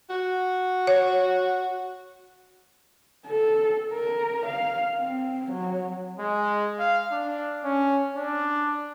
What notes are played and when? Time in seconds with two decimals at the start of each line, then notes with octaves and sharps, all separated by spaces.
0.10 F#4
0.87 C#5
3.27 A4
3.93 A#4
4.46 F5
4.99 C4
5.51 F#3
6.19 G#3
6.79 F5
7.12 D4
7.64 C#4
8.16 D4